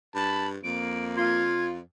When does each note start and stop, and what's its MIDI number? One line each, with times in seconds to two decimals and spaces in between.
0.15 0.58 43
0.15 0.49 81
0.15 0.48 83
0.64 1.81 41
0.64 1.51 58
0.64 1.04 98
1.17 1.73 65
1.17 1.65 92